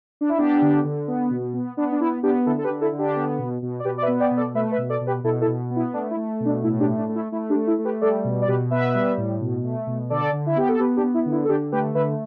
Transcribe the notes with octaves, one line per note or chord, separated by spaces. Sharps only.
D4
E4
B3 D4 G4
D3
D3
B3
B2
B3
B3 D4
D4
B3 E4
B3 D4 G4
D3 E4 A4
A4
G4 B4
D3
E4 A4
D3
D4 G4
B3
B2
B2
D5
B2 G4 B4
D5
B4 E5
B3
D5 G5
B2
A4 D5
A3 B4 E5
B4 E5
B2
A4 D5
B2
G4 B4
B2 E4 A4
E4 A4
B2
B3
E4
A3 D4
E4
A3
B2
D4
A2 E4
D4 G4
A3
D4
A3
E4
A3 E4
D4 G4
A3
E4
A3
G4 B4
G3 A4 D5
B2
D5
B2 G4 B4
B3 B4 E5
G3
A2
B2
A3
B2
D3 A4 D5
D3
E4
B3 G4
A4
B3 G4 B4
D4 G4
B3
E4
D3
E4
A4
D3 D4 G4
A3 G4 B4
D3 B4 E5